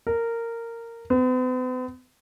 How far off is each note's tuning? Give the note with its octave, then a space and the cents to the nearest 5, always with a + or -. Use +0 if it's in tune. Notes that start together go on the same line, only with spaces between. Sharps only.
A#4 -15
B3 +45